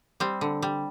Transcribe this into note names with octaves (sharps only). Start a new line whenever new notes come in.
G3 C4
D3
G3